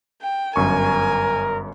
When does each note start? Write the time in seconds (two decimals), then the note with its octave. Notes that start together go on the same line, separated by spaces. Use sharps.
0.22 G5
0.56 G1 F#2 A#4 G#5 C#6